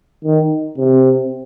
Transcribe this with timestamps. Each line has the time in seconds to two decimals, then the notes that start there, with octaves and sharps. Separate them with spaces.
0.24 D#3
0.78 C3